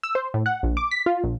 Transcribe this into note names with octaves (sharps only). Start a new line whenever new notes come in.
E6
C5
A2
F#5
A#1
D6
B6
F4
A#1